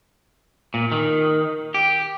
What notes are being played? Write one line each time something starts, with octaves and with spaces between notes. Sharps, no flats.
A#2
D#3
G4